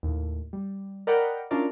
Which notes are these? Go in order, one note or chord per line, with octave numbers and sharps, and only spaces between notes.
D#2 A2
G3
A#4 D5 D#5 F#5 G5 B5
C#4 D4 E4 F4 A#4 D5